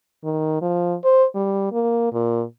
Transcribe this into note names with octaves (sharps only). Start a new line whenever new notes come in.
D#3
F3
C5
G3
A#3
A#2